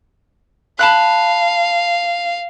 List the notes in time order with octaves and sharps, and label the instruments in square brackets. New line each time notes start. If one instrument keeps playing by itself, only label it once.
[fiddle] F5 [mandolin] A5 B5 F#6